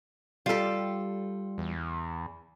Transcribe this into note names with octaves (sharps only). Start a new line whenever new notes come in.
G3 F4 G4 A4
E2